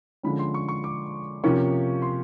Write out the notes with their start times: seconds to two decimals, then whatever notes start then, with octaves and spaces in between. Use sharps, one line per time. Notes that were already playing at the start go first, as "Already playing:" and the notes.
0.23 D3 F3 G#3 C#4 B5
0.39 C6
0.54 C#6
0.69 C#6
0.84 D6
1.44 C3 F3 A#3 C#4 C#6
2.02 C6